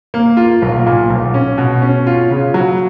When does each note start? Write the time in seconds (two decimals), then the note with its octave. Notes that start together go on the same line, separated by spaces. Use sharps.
0.14 A#3
0.37 F4
0.62 B1
0.86 A#2
1.10 B1
1.34 C#4
1.58 B2
1.82 C#4
2.07 F4
2.31 C#3
2.54 F#3